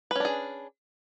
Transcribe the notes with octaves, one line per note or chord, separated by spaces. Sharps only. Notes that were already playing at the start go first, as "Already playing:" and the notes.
C#4 D4 G#4 B4